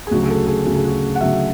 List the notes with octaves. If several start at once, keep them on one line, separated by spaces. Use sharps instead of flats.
G#4
D2 C#3 F#3 F#4
G#4
A4
G#4
D2 C#3 F#3 F#4
G#4
F#4
F#5
D2 C#3 F#3 E5